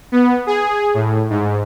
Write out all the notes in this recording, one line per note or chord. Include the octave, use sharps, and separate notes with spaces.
B3
G#4
A2
G#2